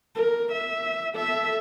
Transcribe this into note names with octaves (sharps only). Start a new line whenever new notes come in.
A#4
E5
A4 E5